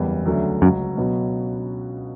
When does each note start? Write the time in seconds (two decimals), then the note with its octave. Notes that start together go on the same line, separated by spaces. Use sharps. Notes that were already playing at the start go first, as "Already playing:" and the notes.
Already playing: F#1 E2 C#3 G3
0.25 D2 C#3 F#3 A3 D4
0.61 C#2 F#2 C#3 F#3
0.97 B2 F#3 B3